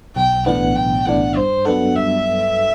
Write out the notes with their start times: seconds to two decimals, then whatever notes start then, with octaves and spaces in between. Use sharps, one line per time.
0.16 B1 G5
0.46 A2 E3 B3 D4 F#5
0.76 B1 G5
1.06 A2 E3 B3 D4 F#5
1.36 G2 C5
1.65 F#3 B3 D4 A4 F#5
1.95 G2 E5